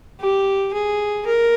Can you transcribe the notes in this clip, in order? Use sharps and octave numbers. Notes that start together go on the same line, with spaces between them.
G4
G#4
A#4